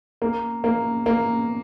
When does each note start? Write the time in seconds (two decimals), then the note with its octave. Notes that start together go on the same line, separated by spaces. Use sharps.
0.22 A#3
0.64 A#3
1.06 A#3